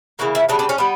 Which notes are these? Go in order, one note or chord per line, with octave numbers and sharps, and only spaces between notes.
C#3 E3 A#3 F#4
E4
C#3 G3 B3 D4
D4
C#4
G3 B3